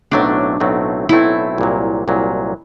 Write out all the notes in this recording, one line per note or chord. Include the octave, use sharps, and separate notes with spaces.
B1 A2 F#3 A3 C4 D4
B1 A2 F#3 A3 C4
B1 A2 F#3 A3 C4 E4
C2 A#2 F#3
C2 A#2 F#3